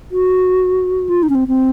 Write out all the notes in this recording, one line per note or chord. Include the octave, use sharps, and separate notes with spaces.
F#4
F4
D#4
C#4
C4
C4